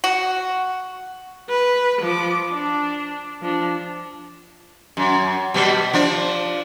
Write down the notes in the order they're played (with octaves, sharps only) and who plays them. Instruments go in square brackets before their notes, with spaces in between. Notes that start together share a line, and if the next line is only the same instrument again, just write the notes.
[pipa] F#4
[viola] B4
F3 D6
D4
F3 D4
[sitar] F#2
B2 G3 B3
F3 D4